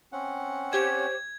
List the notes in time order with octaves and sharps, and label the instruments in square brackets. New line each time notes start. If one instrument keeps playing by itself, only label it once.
[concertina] C4 C#4 F#5
[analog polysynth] G4 C#5 [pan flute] C5 [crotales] G#6